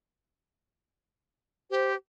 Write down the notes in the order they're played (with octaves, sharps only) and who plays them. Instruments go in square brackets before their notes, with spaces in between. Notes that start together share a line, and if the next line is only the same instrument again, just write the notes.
[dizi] G4 [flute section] C5